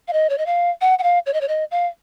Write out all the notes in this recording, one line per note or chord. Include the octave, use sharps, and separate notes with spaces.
F5
D#5
C#5
D#5
F5
F#5
F#5
F5
C#5
D#5
C#5
D#5
F5